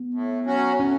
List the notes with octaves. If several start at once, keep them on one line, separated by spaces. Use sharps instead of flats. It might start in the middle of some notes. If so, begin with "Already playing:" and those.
Already playing: B3
A2
F#3 C#4 F#4
A2 C#4